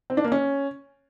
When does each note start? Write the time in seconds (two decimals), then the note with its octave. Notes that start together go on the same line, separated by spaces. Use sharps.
0.10 C4
0.17 D4
0.24 A#3
0.32 C#4